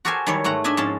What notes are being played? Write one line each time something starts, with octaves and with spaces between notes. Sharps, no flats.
F#4 G4 A4 A#4 C5 G#5
D#3 F#3 G3 E4 C#5
G#2 A3 F#5 A#5
D4 D#5 E5 G#5
G#2 F3 C#4 A5